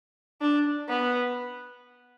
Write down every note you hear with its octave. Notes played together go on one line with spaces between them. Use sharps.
D4
B3